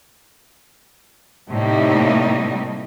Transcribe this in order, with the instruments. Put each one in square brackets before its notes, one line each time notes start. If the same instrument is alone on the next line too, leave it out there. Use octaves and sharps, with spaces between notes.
[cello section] A2 C3 G3 A#3 D#4